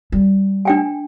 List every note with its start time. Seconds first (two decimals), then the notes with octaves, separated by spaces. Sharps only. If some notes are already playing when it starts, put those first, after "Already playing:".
0.12 G3
0.65 D4 G5 G#5